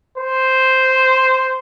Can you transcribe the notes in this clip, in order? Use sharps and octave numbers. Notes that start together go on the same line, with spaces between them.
C5